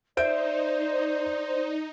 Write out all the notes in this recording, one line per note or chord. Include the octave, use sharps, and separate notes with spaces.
D#4 C5 D5 E5 G6 D7